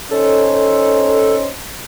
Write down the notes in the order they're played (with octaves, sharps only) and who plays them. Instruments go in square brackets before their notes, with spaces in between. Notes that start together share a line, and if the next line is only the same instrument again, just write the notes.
[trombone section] C#4 D#4 C5 [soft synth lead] A4